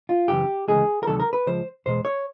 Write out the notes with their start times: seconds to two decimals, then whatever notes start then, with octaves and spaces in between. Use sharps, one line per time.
0.09 F4
0.28 F#2 C#3 E3 G4
0.68 D2 C#3 E3 G#3 G#4
1.03 A#4
1.07 D2 C3 D#3 F#3 A4
1.20 A#4
1.33 B4
1.47 C#2 C#3 F3 C5
1.86 E2 B2 G#3 C5
2.05 C#5